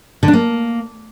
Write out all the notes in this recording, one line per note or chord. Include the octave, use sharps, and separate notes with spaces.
D3
D4
A#3